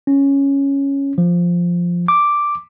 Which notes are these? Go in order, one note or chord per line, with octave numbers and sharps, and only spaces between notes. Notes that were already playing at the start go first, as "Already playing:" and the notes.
C#4
F3
D6